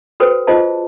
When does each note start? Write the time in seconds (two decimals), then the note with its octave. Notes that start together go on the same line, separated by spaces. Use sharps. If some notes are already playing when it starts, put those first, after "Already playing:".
0.20 F#4 A4 B4 C5 G5
0.47 F4 G#4 C5 D#5 A5